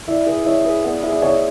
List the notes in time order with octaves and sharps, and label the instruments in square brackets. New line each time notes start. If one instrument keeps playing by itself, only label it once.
[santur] E4 [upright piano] D5
[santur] G#4 B4 [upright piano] D5
[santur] E4 [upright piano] C#5
[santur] G#4 B4
[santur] B3 [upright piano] D5
[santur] E4 G#4 C5
[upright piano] D5
[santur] B3 [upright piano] C#5